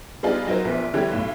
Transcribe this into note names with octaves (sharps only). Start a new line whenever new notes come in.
G3 B3 D4 D#4 F4 G#4
F#3 D#4 F4 A#4 C5
A#1 A#2 B3
D3 E3 G3 G4 C#5
B1 A2